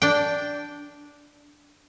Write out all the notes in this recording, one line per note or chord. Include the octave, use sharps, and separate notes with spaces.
D4 G5